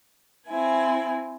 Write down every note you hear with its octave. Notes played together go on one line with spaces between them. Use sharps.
C4 E4 G#5